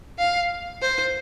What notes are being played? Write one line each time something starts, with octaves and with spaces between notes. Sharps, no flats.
F5
C5